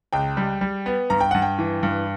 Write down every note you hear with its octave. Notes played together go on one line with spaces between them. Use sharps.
C#2 G5
G3
G3
B3
G2 A#5
G5
G2 F#5
G5
E3
G2